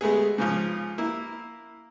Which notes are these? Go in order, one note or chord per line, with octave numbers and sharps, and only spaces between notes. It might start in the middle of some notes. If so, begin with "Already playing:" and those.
G#3 A3 B3 G#4
G#2 C#3 F3
A#3 E4